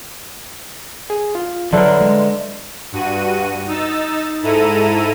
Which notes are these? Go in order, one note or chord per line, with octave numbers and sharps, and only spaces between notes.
G#4
F4
D3 F#3 A#4 B4 E5 C6
G#3
G2 F#4 D#7
D#4 E6 A6
G#2 E4 A4 A#5 D#7